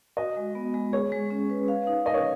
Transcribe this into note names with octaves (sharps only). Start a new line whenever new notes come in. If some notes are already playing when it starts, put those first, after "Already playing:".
F#4 D#5
G#3
B3
G#3
G#4 C#5
G#3
C#4
B4
F5
D#4
A#4 D#5
C#5